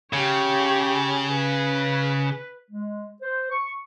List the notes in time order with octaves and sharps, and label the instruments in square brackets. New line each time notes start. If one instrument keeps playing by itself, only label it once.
[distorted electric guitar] C#3 [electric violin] G4 C#5
[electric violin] B4
[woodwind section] G#3
C5
C#6